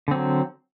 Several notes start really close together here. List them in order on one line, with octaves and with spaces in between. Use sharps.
D3 C4 F#3